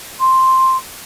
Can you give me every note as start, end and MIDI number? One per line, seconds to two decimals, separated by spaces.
0.20 0.77 84